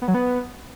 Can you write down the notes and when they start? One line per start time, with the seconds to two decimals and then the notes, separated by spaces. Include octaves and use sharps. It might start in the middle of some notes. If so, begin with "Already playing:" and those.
0.02 B3
0.08 F#3
0.14 B3